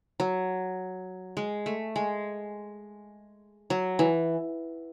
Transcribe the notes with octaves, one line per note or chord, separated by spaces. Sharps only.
F#3
G#3
A3
G#3
F#3
E3